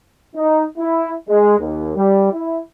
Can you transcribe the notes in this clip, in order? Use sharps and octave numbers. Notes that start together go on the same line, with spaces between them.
D#4
E4
G#3
D#2
G3
E4